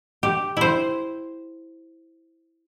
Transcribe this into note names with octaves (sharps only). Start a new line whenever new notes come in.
G4
E4 C5